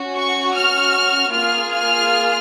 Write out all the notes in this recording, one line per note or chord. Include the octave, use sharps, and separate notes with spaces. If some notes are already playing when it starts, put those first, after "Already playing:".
Already playing: C#4 F#4
C#6
F6
A#3 F4 G#4 F6
F6